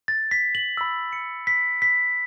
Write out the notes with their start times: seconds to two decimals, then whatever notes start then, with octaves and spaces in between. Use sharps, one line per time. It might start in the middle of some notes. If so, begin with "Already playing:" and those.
0.08 A6
0.31 B6
0.55 F#7
0.77 B5 E6
1.13 C#7
1.47 B6
1.82 B6